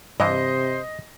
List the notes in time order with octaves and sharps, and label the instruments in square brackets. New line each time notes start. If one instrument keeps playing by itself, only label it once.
[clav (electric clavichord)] G2 E3 [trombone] C3 [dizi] C5 [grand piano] D#5